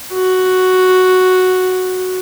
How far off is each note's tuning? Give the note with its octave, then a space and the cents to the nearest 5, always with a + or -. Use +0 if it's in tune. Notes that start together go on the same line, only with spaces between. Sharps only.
F#4 +0